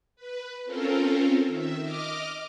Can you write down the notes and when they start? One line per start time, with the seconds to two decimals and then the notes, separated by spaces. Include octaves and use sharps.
0.16 B4
0.65 C4 C#4 F4 A4 A#4
1.47 D#3 E5
1.81 D#5 D6 F6